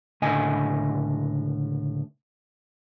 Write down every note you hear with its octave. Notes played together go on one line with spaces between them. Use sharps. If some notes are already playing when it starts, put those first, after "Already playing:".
C#2 A2 D3 D#5 G#5